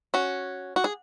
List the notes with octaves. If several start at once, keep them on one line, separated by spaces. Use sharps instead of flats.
C#4 F#4
F#4
G#4